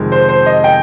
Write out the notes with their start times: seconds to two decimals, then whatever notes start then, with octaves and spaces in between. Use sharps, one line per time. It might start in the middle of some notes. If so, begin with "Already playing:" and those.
Already playing: F2 C3 D#3 G#3
0.12 C5
0.29 C5
0.46 D#5
0.64 G5